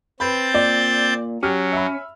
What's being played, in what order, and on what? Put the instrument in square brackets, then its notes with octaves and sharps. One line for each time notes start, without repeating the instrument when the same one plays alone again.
[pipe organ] C4 G6 A6 [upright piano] B4 B5
[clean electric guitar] A#2 [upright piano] D5
[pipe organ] F#3 [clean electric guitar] C#4 [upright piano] G4 F6
[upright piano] E5 B5